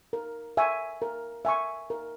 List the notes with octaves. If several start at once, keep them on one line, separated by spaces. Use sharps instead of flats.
A#4
E5 G#5 C#6
A#4
E5 G#5 C#6
A#4